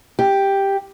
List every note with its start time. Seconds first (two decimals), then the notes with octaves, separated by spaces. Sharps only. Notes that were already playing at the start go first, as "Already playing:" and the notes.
0.19 G4